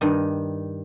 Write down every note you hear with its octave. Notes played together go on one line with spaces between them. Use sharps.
G2 D#3